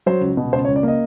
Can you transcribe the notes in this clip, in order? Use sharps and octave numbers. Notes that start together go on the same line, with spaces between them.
F#3 C5
C#2
B2
C#2 C5
C#5
C#2
D5
A#3 D#5